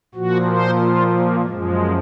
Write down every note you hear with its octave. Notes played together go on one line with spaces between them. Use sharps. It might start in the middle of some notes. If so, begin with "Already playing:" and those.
A#2 F3 F#4
C5
F4
A#3
F#2 F3 G#3